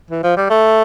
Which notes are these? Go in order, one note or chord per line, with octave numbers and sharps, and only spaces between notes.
E3
F3
G3
A3